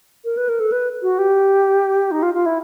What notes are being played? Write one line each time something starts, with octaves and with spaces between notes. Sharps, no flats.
A#4
B4
A#4
A4
B4
F#4
G4
D#4
F4
F4
E4